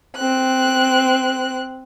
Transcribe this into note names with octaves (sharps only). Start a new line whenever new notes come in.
C4 F#6